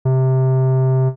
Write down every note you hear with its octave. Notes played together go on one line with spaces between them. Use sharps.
C3